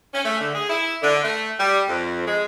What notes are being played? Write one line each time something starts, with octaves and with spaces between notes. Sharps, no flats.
C#4
A3
D3
G#4
E4
D3
A3
G3
F2
G#3